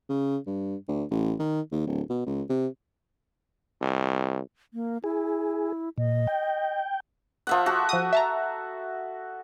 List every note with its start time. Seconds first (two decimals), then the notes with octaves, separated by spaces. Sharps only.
0.09 C#3
0.47 G2
0.88 D2
1.11 A1
1.39 D#3
1.72 D#2
1.87 D1
2.10 B2
2.26 C#2
2.50 C3
3.82 C2
4.74 A#3
5.04 E4 G#4
5.98 A#2 D#5
6.27 G5
7.47 F3 E5 F#5
7.66 F#4 A4
7.89 F3 D#6
8.13 E5 A5 A#5